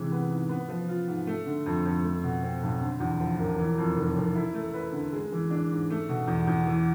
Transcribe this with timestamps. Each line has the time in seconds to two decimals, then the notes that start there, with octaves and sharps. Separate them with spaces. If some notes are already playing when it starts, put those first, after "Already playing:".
Already playing: C3 E3 G#3
0.12 B3
0.31 G#2
0.49 B3
0.69 F3
0.89 F4
1.08 G#2
1.27 A3
1.46 D3
1.66 F2
1.85 F2
2.04 A3
2.23 B2
2.43 C4
2.62 B1
2.81 D3
3.00 E2
3.20 F3
3.39 E1
3.59 E3
3.78 F2
3.96 F1
4.15 F1
4.35 E4
4.54 A3
4.74 B4
4.93 D3
5.13 G#3
5.32 E3
5.50 D4
5.71 G#2
5.90 A3
6.09 B2
6.28 E2
6.47 E2
6.67 E3